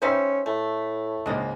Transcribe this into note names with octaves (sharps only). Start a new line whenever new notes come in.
G3 C#4 D#4 B4 C5 E5 C6
A2 A3
C#2 G#2 A#3 D4 D#5